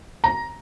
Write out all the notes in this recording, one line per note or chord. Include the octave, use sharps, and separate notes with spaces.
A#5